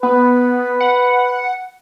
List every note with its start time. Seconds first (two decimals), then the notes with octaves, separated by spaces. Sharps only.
0.03 B3 B4
0.81 F#5